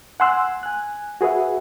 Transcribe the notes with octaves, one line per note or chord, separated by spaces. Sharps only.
F#5 G#5 C6 E6 F#6
G#5 F#6
F#4 G#4 B4 E5 F#5